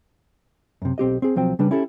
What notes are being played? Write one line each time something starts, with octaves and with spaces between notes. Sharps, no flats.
F#2 C3
B1 C4 G4 D#5
C4 G#4
B1 F3 F#3 C4 G5
C#3 G3 D4 B4
C#4 E4 G4 A4